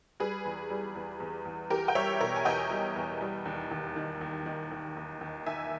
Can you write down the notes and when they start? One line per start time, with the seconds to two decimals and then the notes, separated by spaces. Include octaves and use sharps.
0.20 G3 G#4 B4
0.45 E2
0.70 G3
0.95 E2
1.20 E2
1.45 E2
1.70 E2 G4 A#4
1.88 G5
1.95 G3 C#5 E5
2.21 B2 A#4 C#5
2.36 G#5
2.45 E2 D#5 G5
2.70 G3
2.96 E2
3.21 G3
3.46 D#2
3.71 D#2
3.96 D#3
4.21 D#2
4.46 D#3
4.71 D#2
4.96 D#2
5.21 D#2
5.46 D#3 E5 G#5